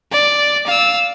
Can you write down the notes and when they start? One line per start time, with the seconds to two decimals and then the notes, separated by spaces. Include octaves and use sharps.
0.12 D5
0.67 F5 E6